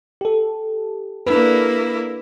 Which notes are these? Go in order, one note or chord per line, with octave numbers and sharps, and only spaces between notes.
G4 A4
A#3 D4 E4 B4